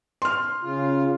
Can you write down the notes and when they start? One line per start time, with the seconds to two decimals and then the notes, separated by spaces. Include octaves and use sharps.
0.22 C6 F6
0.63 C#3 F4